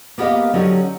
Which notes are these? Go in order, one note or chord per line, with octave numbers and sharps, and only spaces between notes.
A#3 B3 G4 A#4 D#5 F5
D3 F#3 C#4 D#4 G4